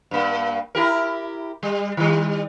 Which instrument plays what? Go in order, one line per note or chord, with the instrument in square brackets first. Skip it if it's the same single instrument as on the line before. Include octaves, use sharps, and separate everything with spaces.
[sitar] G2 A#3
E4 G4 A#4
G3
D#3 G3